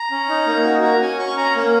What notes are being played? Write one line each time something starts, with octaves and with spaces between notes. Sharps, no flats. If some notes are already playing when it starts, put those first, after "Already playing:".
Already playing: A#5
C#4
D#4
A#3
F#4
F#4 A#5
C#4 G#5
C#4 C#6
C#4 A#5
A#3